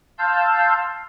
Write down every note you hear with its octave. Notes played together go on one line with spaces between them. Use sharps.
F5 A5 C6 E6 G6